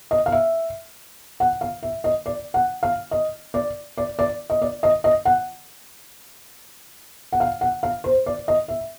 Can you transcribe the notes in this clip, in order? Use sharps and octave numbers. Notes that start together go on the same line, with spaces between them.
D#5
F5
E5
F#5
F5
E5
D#5
D5
F#5
F5
D#5
D5
D5
D5
D#5
D5
D#5
D#5
F#5
F#5
F5
F#5
F5
C5
D5
D#5
E5